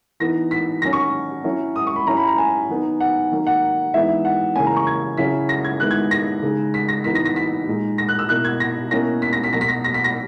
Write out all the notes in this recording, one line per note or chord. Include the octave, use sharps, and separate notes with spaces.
E3 B3 D#4 A#6
B6
D#3 F#3 C#4 A#6
C#6
F#3 C#4 E4
D#6
C#6
B5
F#3 C#4 E4 A#5
B5
A#5
G#5
D#3 F#3 B3 D#4
F#5
D#3 F#3 A#3
F#5
E3 G#3 B3 D#4 E5
F#5
C#3 E3 A#3 C#4 G#5
A#5
C#6
G#6
C#3 F#3 C#4 E4 B6
A#6
G#6
D#3 G#3 B3 E4 F#6
G#6
A#6
C#3 G#3 D#4
B6
A#6
E3 B3 D#4 B6
A#6
A#6
B6
A#2 G#3 D#4
A#6
F#6
E6
B2 A#3 E4 F#6
G#6
A#6
B2 A#3 C#4 E4 A#6
B6
A#6
B6
B2 F#3 A#3 A#6
B6
A#6
A#6
B6
A#6